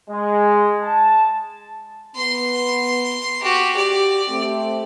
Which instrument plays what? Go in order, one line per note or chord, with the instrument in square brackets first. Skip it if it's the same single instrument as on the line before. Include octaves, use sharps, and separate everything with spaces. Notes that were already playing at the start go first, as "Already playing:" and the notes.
[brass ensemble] G#3
A5
[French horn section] B3 [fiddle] C6
[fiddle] F#4 G4
[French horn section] G4 [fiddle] D5
[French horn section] A3 C4